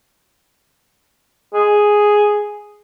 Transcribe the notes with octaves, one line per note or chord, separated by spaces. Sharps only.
G#4